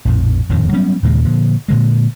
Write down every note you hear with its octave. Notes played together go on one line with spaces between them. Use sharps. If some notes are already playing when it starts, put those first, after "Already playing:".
A#1 F2 A2
D#1 F2 A2 D#3
F#3 G3 B3 C#4
D#2 A#2 C#3 G#3
A#2 D3 F3
A#2 D3 G#3